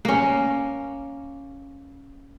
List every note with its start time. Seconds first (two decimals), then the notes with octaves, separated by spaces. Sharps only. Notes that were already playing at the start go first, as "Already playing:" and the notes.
0.05 A#3 C#4